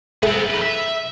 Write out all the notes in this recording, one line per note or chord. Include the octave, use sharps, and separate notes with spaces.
A3 B3 C4 G#4 G#5
D#4 B4
E5